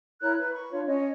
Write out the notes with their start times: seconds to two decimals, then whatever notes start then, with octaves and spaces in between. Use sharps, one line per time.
0.22 E4 A#4 C#5 F#6
0.37 B4
0.53 B5 C#6
0.71 D4 F4 C#5
0.87 C#4 C#5 D#5